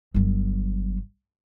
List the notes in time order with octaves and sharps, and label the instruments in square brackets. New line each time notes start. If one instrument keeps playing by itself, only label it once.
[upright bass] G1 F#3